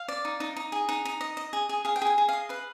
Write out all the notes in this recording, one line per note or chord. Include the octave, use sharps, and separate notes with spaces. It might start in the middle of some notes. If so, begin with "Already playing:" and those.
Already playing: F5
D5
D#4
D#4
D#4
G#4
D#4
D#4
D#5
D#5
G#4
G#4
G#4 F5
G5
G#4 G#5
G#4
D#5 F5
B4 F5